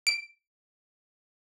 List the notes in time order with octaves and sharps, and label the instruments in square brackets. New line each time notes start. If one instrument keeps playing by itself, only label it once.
[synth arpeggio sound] D7